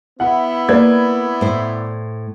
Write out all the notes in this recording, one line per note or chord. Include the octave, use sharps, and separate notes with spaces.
B3 E4 F#5
A#3 B4 D5 G#6
A2 C5